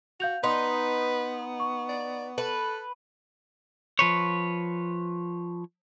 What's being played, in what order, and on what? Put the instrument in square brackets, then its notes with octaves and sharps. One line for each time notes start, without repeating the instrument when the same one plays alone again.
[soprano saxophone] F#4 [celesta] F5 G6 F7
[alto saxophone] B3 [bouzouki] D#4 [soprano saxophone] B4 [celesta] C6
[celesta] C#6
[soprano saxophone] D5
[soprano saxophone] A4 [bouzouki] B4
[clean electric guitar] F3 B4 C#5